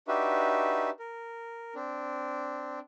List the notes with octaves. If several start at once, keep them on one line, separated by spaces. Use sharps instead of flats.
D4 D#4 F#4 G4 B4 E5
A#4
C4 D4